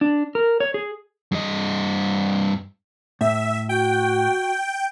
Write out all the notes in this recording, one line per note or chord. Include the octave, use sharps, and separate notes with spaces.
D4
A#4
C#5
G#4
G2 D#5
A2 E5
F#4 G5